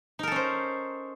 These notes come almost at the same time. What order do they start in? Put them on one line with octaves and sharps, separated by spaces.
D#4 A#4 A4 C#4 C5